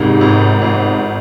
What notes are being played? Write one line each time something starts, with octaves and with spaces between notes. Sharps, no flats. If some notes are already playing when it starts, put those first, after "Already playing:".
Already playing: G#1 G#2 C3
G#1
G#1